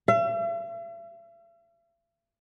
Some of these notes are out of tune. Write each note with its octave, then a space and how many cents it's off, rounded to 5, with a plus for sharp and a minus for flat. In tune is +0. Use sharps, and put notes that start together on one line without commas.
E5 +45